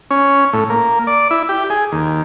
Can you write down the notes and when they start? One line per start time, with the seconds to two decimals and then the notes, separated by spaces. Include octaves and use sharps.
0.11 C#4
0.53 A2
0.70 A#3
1.07 D5
1.31 E4
1.49 G4
1.70 G#4
1.92 D#2